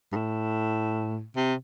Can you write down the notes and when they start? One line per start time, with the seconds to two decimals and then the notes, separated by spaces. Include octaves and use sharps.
0.12 G2
0.16 A2
1.36 C3